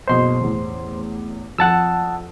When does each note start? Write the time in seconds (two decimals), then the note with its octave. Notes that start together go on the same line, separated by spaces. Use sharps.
0.08 F#1 B2 C5 D#5 C6
0.41 A1 E2
1.58 F2 F#5 A5 E6